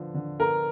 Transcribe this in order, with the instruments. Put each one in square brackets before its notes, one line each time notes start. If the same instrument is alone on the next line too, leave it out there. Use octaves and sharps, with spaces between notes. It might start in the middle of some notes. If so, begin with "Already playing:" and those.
Already playing: [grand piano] D3 F3 B3
D3
[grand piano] B3 [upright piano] A#4